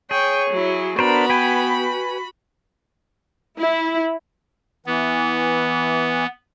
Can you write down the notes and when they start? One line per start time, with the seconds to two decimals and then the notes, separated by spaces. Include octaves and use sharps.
0.11 G#4 C#5 G5 C#6
0.50 F#3 E4
0.99 B3 D4 F#4 A#4 C5 B5
1.30 B4 G5 G#5
3.58 E4
4.86 E3 B3